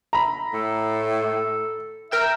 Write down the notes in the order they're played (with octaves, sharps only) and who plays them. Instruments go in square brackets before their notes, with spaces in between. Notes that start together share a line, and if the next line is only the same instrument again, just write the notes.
[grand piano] A#5 B5
[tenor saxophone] A2 [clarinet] A4
[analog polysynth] A#4 G5 E6 [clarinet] E5